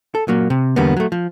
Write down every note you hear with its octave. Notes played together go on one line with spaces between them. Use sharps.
A4
A#2 F#3 A#3
C3
E2 D3 G3 A#3 B3
F#3 A3
F3